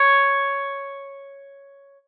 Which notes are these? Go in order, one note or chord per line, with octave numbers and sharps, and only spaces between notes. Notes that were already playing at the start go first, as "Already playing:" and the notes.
Already playing: C#5